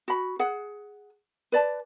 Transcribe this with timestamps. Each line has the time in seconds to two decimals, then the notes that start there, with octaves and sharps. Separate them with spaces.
0.08 F#4 B5
0.39 G#4 F#5
1.52 B4 D5 A5